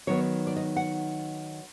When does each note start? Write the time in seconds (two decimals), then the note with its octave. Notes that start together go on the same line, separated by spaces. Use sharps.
0.07 D#3 F#3 B3 D#4 C#5
0.47 D5
0.56 D#5
0.76 F#5